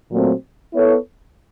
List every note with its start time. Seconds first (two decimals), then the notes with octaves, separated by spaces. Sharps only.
0.10 A#2 F#3 A3 C4
0.73 B3 E4 A4 C#5